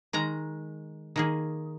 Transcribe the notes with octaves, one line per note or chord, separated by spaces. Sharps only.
D#3 G#3 A#5
D#3 A#3 G#4